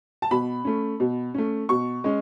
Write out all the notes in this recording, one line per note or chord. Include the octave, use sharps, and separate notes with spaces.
A5
B2 B5
A3 C#4
B2
A3 C#4
B2 C#6
G#3 C#4